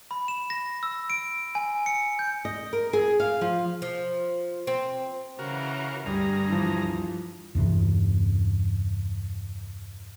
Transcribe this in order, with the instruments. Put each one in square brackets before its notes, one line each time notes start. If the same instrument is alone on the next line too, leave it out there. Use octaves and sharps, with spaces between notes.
[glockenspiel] B5
E7
A#6
E6
D7
G#5
C#7
G6
[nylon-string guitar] D#5
A#4
G#4
F5
F3
[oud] F3
C4
[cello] C#3 E3 [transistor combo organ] F#4 A#4
[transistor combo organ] D2 G#4 A#5 [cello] G2 [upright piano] G3
[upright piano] E3 F3
[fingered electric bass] E2 G2 C3 E3